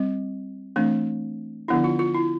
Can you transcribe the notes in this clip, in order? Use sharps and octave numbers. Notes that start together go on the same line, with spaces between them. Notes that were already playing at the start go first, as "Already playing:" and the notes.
Already playing: G3 C4
E3 A3 C4 D4
D3 F3 B3 D4 E4
F4
F4
E4